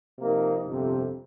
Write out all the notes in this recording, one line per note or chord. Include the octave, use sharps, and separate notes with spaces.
C3 F3 A#3 D#4
G1 F2 C3